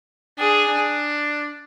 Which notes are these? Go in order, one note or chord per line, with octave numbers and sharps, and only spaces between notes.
D4 G#4
D4